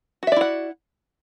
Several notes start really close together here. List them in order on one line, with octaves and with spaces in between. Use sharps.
F#4 E5 D5 E4 F#5